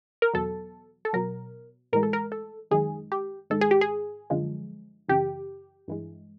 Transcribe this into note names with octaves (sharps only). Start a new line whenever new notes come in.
A#4
E2 B2 F#3 A4
A4
B2 F#3 A#4
A2 E3 G#3 A#4
A4
A#4
A4
F#2 D#3 G#3 G#4
G4
G#2 D#3 G#3 A4
G#4
G4
G#4
F#2 D3 F3 G#3
F#2 C#3 E3 G4
G2 E3 G#3